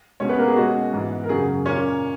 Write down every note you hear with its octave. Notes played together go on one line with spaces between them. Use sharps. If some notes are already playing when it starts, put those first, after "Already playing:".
B2 G#3 C#4 C#5
B3 B4
A#3 A#4
G#4
B2 G#3 C#4 F#4
G#2 E3 B3
A#4
F#2 C#3 F#3 G#4
A#2 A#3 C#4 C#5